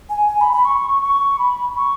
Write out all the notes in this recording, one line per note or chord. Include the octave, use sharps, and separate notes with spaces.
G#5
G#5
B5
B5
C#6
C#6
B5
B5
C#6